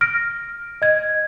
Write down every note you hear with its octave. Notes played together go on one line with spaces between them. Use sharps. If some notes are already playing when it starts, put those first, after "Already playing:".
F6 A#6 D7
D#5 G#6